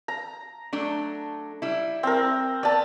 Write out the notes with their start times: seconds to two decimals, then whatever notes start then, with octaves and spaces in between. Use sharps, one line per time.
0.08 A#5
0.73 F#3 A3 D4
1.62 G3 E4
2.03 C4 A#4
2.63 B3 D5 A5